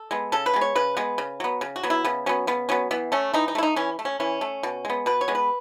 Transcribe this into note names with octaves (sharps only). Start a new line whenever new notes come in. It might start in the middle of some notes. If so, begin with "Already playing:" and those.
Already playing: A4
G#3 B3
C#3 A4
B4
G#3 B3
C#5
C#3 B4
G#3 B3
C#3
F#3 B3
C#3
F#4
F#3 B3
E4
C#3 B3
F#3 B3 C#4
C#3 B3
F#3 B3 C#4
E3 B3
A3 C#4
E3 D#4
D#4
A3 E4
D#4
E3 C#4
A3
C#4
E3 C#4
A3
B2
G#3 B3
B2 B4
C#5
G#3 B3
B4